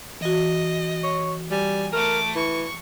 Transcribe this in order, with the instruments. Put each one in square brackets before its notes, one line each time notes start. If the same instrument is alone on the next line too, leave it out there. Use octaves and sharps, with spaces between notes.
[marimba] E3 F#4 [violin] D#5
[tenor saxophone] C#5
[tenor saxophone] G3 [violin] G#5
[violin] A3 D6 [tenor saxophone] A#4
[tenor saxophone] E3 [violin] C#6